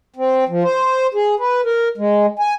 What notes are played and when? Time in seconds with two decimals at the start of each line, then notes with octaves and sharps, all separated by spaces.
0.16 C4
0.49 F3
0.63 C5
1.14 G#4
1.40 B4
1.65 A#4
1.98 G#3
2.39 G#5